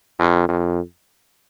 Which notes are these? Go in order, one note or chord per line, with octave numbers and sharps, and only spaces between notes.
F2
F2